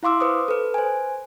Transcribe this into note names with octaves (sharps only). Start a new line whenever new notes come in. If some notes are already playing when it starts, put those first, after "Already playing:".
E4 F5 C6 D6 E6
B4 C5 D#6
A4 B4
C5 G#5